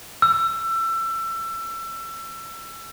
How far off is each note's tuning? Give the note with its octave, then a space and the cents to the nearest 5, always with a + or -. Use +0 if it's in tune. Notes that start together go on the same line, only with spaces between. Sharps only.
E6 +25